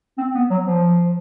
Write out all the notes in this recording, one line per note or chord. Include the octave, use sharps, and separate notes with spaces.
C4
B3
F#3
F3